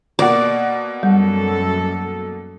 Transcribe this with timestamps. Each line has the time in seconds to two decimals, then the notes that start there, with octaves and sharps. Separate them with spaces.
0.19 B2 A#3 F#4 D5
1.03 F#2 G3 A4